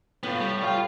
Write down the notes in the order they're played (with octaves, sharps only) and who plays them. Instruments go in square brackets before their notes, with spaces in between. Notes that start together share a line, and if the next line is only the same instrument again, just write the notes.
[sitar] A2 [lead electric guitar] B3 F4
[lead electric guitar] G3
[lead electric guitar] F4 [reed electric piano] C#5 G5